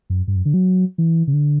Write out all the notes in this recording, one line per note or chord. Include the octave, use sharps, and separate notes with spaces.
F#2
G2
F#2
D3
F#3
E3
C#3
D3